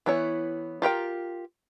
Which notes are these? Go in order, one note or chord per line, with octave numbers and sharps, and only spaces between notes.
E3 B3 E4 C#5
F4 G4 A#4 G5